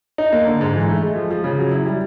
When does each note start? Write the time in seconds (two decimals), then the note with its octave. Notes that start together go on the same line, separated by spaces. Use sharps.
0.18 D#4
0.32 A#3
0.46 D3
0.61 G#2
0.75 E3
0.89 A3
1.02 G#3
1.16 F3
1.30 F3
1.44 C#3
1.58 F#3
1.72 E4
1.86 G3